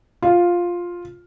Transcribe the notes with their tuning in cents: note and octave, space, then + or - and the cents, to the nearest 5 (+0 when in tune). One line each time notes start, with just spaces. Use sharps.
F4 +5